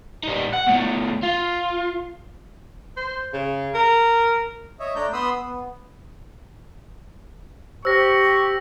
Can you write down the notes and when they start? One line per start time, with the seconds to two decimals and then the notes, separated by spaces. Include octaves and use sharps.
0.24 G3 D#4
0.54 F#5
0.67 B2 A3
1.23 F4
2.97 C5
3.33 C#3
3.74 A#4
4.80 C#5 D#5 E5
4.96 A3 D4 D5 A#5 G6
5.13 B3 B5 C6 D#6 E6
5.39 B3
7.85 G4 C5 C#6 E6 A#6